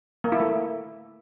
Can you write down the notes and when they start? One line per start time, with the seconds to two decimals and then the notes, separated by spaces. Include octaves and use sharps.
0.24 A#3
0.32 E4
0.40 A3